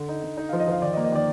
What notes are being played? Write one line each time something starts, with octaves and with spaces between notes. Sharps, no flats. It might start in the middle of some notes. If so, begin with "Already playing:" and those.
Already playing: D3
D#4
D3
D#4 D#5
F3 F5
D#5
F3 F5
D#3 D5
D#5
A#3
D#5
D#3 D5